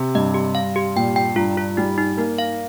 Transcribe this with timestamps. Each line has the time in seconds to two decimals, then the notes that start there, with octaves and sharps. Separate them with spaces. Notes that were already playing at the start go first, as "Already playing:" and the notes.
Already playing: C3 G4
0.15 G2 D#5
0.34 G4
0.55 F5
0.76 G4
0.96 A#2 G5
1.16 G5
1.36 G2 F4
1.57 F4
1.77 G3 D#4
1.98 D#4
2.17 A#3 D#4
2.38 F5